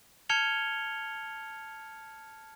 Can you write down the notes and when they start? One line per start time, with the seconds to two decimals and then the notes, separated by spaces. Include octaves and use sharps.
0.29 A5 F6 G#6 C#7 F7 G7